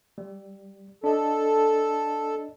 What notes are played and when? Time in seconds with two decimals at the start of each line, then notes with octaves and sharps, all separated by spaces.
0.18 G3
1.04 D4 A4 D#5